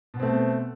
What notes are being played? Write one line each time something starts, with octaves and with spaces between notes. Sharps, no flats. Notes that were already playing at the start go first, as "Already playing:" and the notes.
B2 A3 B3 C4